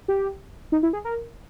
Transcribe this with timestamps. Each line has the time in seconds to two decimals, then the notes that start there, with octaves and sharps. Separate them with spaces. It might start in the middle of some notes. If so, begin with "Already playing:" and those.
0.08 G4
0.72 D#4
0.83 E4
0.93 G#4
1.05 A#4